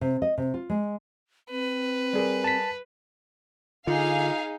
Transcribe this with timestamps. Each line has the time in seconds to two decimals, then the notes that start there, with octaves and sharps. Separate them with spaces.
0.01 C3
0.22 D#5
0.38 C3
0.54 F4
0.70 G#3
1.51 C4 B4
2.13 G3 G#4 A#4
2.44 A5 B6
3.87 D3 D#4 F4 G#4 F5